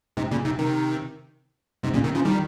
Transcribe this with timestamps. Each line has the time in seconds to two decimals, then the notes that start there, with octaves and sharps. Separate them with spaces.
0.17 G#2 C3
0.31 A#2 C#3
0.45 C3 D#3
0.58 C3 D#3
1.83 G#2 C3
1.94 A#2 C#3
2.04 C3 D#3
2.15 C#3 F3
2.25 D#3 G3